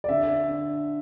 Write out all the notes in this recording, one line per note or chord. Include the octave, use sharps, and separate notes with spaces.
D5
D3 E5
D4